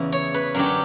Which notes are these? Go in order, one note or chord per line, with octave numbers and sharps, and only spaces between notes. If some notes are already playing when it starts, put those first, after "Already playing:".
Already playing: E2 C#3 E3
C#5
B4
F#2 D3 F#3 G4